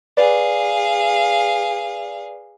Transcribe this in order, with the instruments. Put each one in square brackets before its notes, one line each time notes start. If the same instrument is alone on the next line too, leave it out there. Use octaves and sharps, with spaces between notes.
[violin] G#4 F5 [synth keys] B4 D5